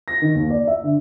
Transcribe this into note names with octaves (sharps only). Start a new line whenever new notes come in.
A#6
D#3
D#2
D5
E5
D3